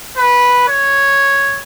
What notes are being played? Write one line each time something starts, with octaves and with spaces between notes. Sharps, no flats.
B4
C#5